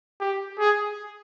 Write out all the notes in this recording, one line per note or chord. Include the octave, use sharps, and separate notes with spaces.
G4
G#4